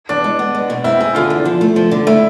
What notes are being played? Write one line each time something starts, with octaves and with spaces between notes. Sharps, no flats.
E2 D4
G#3
B3
G#3
B2
C4 E4
E4 G#4
D3 F4
E2
F3
A3
F3
D3
A3 E4